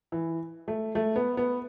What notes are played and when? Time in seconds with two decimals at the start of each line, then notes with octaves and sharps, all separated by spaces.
0.12 E3
0.68 A3
0.95 A3
1.16 B3
1.37 B3